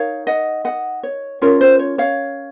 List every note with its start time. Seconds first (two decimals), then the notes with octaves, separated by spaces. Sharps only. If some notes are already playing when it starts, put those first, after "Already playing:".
Already playing: D#4 A#4 C#5 F5
0.27 D#5 F#5
0.65 D#5 F#5
1.03 C#5
1.42 C#4 F4 A#4 C#5
1.61 C5
1.79 C#5
1.98 C#5 F5